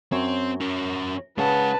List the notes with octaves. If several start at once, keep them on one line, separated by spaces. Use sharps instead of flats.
F#2 C4 C#5
C#4 A#4
C#3 G#3 B4 F#5 A5